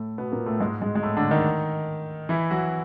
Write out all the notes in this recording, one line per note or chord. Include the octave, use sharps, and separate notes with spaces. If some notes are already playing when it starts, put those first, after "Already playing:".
Already playing: A2 A3
B2 B3
A#2 A#3
A2 A3
G#2 G#3
G#2 G#3
G#3
A2 A3
D3 D4
D#3 D#4
E3 E4
F#3 F#4